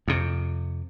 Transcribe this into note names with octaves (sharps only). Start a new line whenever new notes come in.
F2 C3